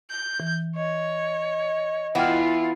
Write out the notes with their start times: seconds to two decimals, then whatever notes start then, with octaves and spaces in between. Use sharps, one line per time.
0.10 G6
0.40 E3
0.76 C#5 D#5
2.15 E3 B3 E4 F4 F#5 G5 F6